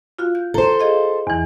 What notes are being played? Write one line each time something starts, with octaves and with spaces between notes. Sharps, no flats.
F4 F#4 F5
G6
A4 C5 A#5
G#4 D#5 F5
E2 E3